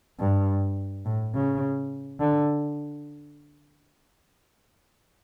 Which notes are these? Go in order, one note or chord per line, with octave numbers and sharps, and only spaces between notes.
G2
A2
C#3
D3